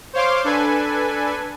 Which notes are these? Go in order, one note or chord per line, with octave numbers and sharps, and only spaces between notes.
C5 C#5 F5 C6 D6
D4 A4 B4 G#5